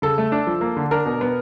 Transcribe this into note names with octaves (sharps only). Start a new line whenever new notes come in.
C#3 A4
A3
D4
F3
A#3
D3
D4 A#4
B2
B3